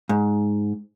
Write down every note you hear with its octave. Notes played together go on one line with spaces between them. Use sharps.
G#2